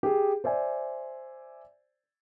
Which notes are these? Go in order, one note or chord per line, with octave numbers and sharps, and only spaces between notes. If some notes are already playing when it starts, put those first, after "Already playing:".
G4 G#4
C5 D5 E5 G#5